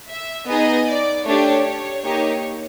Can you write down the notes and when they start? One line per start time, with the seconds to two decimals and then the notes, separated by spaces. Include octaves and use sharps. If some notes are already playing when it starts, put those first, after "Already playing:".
0.10 E5
0.49 B3 D#4 G#4 D#5
0.87 D5
1.26 A3 D4 G4 C#5
2.04 A#3 D#4 G4 C#5